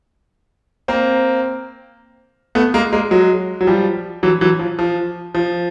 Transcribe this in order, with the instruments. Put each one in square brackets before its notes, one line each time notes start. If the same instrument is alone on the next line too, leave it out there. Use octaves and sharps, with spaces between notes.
[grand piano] A#3 C4
A3 B3
G#3 A#3
G#3 A#3
F#3 G#3
F#3
F3 G3
E3 F#3
E3 F#3
F3
F3
F3